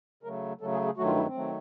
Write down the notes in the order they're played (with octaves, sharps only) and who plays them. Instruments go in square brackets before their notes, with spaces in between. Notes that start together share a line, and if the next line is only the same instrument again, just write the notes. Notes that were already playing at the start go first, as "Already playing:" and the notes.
[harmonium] C#3 F#3 A3 A#4
C#3 F#3 A3 A4
G#4
G#4
G2 D#3 F#3 A3 F#4
F4
E4
C4
D#3 F#3 A3